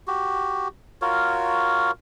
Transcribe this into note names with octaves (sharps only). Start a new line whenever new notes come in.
F#4 G4
F4 F#4 A#4 C#5